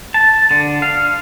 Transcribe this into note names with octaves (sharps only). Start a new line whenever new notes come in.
A5
D3
F5